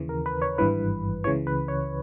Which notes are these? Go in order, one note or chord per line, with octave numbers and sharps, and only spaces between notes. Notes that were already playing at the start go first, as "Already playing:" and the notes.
Already playing: D#2 C#3 E3
A#4
B4
C#5
G#1 G2 E3 B4
C#2 C#3 E3 C#5
B4
C#5